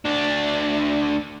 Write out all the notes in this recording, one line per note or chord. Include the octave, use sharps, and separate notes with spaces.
D2 D4